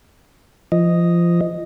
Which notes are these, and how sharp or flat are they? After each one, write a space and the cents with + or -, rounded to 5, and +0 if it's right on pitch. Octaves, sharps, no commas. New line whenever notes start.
F3 -25 D#5 +0